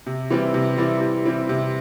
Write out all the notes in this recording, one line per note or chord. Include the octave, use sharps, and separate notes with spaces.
C3
E3 G3 C4 E4
C3
E3 G3 C4 E4
C3
E3 G3 C4 E4
C3